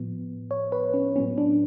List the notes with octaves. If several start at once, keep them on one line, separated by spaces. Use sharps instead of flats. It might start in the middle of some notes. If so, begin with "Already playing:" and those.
Already playing: A2 F3 B3
C#5
B4
C#4
A2 F#3 B3 C#4
D4